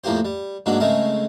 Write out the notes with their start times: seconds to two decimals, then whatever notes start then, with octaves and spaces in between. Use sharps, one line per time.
0.04 F2 A2 A#3 G4 C5
0.25 G3
0.66 G#2 F#3 G#3 A#3 D4
0.80 C#3 G#3 A3 C4 A#4